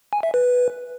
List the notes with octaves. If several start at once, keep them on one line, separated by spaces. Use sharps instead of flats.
G#5
E5
B4